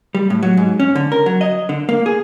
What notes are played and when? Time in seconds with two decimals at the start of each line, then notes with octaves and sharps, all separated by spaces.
0.15 G3
0.30 A2
0.43 F#3
0.57 G#2
0.80 C#4
0.95 D3
1.12 A#4
1.26 F#3
1.41 D#5
1.69 D3
1.89 A#3
2.06 G#4